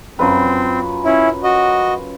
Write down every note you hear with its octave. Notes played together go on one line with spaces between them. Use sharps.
F#2 C4 F4 B4
C#4 E4
F#4 D#5